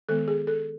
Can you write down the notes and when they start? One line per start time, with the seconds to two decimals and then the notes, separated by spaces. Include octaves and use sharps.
0.09 D#3 G#3 B3 A4
0.28 G#4
0.47 A4